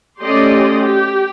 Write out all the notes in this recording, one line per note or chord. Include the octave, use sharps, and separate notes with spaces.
A3 C#4 G4 D5 D#5 C6
G4